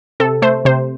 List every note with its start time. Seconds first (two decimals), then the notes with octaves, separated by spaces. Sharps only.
0.20 C3 A4
0.42 A3 C5
0.65 C3 C5